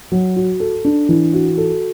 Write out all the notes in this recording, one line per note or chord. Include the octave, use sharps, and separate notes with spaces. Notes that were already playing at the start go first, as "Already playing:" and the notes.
F#3
F#4
A4
D4
E3
F#4
A4